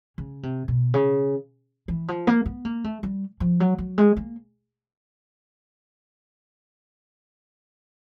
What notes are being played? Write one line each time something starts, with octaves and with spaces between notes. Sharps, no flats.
C#3
C3
B2
C#3
E3
F3
A#3
B3
A#3
A3
G3
F3
F#3
F#3
G#3
A#3